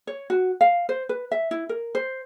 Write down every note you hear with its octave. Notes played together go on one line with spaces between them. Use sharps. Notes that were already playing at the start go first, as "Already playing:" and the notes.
C#5
F#4
F5
C5
B4
E5
E4
A#4
C5